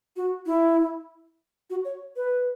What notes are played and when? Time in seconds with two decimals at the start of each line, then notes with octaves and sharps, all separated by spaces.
0.16 F#4
0.46 E4
1.70 F#4
1.85 C#5
2.16 B4